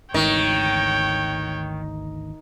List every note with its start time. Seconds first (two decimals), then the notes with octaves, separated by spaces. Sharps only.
0.14 G#1 D2 D#3 E3 C#5 G5